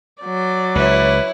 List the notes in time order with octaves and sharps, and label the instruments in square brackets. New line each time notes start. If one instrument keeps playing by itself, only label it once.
[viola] F#3 D5
[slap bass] C#2 [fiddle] E4 C#5 [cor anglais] B4